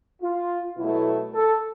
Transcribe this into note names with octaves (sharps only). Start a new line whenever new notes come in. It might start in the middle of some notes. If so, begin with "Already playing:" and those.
F4
B2 F#3 A3 E4
A4